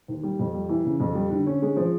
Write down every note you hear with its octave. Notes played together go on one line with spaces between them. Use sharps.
D#2
G3
F2
G3
E3
C#3
F2
G3
D3
C#4
G#3
F3